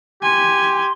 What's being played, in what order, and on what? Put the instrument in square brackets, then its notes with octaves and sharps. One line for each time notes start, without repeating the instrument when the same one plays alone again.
[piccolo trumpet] G4 [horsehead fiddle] G#5 [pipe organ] C6